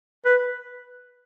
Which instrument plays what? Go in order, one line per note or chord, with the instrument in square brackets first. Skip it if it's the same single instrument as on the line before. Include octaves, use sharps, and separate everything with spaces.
[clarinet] B4